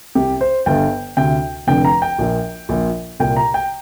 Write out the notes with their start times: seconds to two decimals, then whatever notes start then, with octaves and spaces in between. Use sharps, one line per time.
0.15 C2 C3 G4
0.41 C5
0.66 G1 G2 D3 G5
1.17 D2 C3 G5
1.67 F1 F2 D3 G5
1.85 A#5
2.02 G5
2.19 A#1 A#2
2.69 A#1 A#2
3.20 C2 A#2 G5
3.36 A#5
3.54 G5